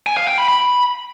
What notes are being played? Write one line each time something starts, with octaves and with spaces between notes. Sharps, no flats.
G#5
F5
G5
B5
B5